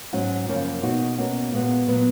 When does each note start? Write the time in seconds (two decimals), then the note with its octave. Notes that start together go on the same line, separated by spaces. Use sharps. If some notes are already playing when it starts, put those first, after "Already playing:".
0.13 G#2 F#3 C#4 F#4
0.48 F#2 C#3 F3 A#3 C#4
0.83 B2 A#3 D#4 F#4
1.18 B2 A#3 C#4 F#4
1.52 A#2 G#3 B3 F#4
1.88 A#2 F#3 B3